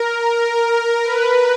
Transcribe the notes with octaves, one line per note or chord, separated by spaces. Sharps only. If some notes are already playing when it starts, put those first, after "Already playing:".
Already playing: A#4
A#4
B4